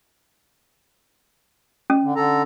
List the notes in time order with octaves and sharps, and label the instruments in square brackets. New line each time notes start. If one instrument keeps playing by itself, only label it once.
[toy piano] C#4
[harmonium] D3
D3 A4 A#5